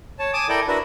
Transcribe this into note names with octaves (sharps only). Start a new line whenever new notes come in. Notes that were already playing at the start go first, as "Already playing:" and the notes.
C#5 A5
G#5 A5 D6 D#6
E4 A4 A#4 D5 G5
D4 E4 F#4 A#4 B4